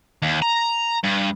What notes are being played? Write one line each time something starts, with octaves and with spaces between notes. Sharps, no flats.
D#2
A#5
G2